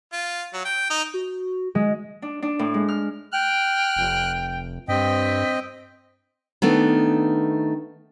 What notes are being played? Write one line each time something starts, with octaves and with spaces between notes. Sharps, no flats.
F4
F#3
G5
D#4
F#4
G#3
D4
D4
A2
G#3
F6
G5 F6 F#6
F1
G2 C4 D#5 G5 B6
D#3 A3 B3 D4